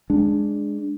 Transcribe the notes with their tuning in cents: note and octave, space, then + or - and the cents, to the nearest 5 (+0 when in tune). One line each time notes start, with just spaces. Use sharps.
G#3 +0 D4 +0